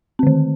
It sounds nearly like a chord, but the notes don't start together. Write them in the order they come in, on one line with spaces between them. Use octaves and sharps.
C4 D3 D#3